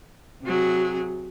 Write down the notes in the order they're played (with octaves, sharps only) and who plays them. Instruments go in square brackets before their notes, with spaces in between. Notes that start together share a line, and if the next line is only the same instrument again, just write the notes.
[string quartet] C3 F#3 G#4